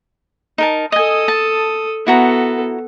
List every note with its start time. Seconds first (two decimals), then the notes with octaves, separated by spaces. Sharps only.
0.58 D#4 A#4 A5
0.92 A4 D#5 G#5 D#6
1.28 A5
2.07 B3 E4 F#4 A4 A#5